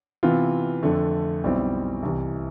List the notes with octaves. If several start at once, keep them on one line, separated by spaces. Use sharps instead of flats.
C3 E3 B3 F4
F2 D3 A3
B1 B2 G3 C4 E4
C2 C3 E3